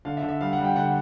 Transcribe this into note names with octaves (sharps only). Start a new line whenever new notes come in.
D3 F5
E5
D3
E5
G3 F5
F#5
G3
G5
D3 F#5